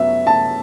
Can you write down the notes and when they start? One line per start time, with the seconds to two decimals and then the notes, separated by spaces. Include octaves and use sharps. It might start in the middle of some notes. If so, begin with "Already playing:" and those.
Already playing: F#2 F#3 B3 E5
0.27 A5